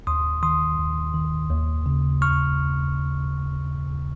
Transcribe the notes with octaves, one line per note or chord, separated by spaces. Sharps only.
D#2 C6 D#6
D#3 C6 D#6
D#2
D#3
D#2
C#3
D#2 C#6 F6